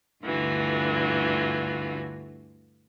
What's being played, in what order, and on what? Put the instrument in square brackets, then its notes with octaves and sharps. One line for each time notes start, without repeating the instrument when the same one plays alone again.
[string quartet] D2 G2 D3 E3 F4 F#4